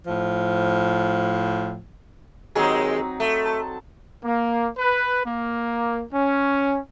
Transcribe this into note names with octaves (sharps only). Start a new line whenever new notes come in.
A2 F3
D#2 F#3 G#3 C4 D#4 G#4
A3
A5
A#3
B4
A#3
C#4